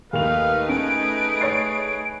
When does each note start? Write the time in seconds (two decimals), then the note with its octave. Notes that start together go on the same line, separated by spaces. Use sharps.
0.13 D#2 A3 D#4 B4 F5 F7
0.69 C#4 G#4 D7
1.41 C#5 A6 C7